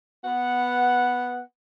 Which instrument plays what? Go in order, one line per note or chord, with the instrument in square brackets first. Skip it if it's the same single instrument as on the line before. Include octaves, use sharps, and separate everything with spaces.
[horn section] B3 F#5